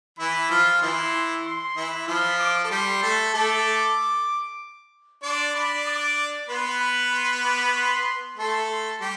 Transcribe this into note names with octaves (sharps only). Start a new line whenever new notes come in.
E3 E4 B5
F3 F4
E3 E4 C6
C6
E3 E4
F3 F4 B5
D6
A4
G3 G4 C6
A3 A4
A3 A4 D6
D4 D5 C6
D4 D5 B5
D6
B3 B4 C6
B5
C6
D6
C6
A3 A4 C6
C6
G3 G4